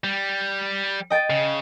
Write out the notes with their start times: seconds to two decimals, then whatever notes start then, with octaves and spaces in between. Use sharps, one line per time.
0.04 G3
1.10 D#5 G5 A6
1.30 C#3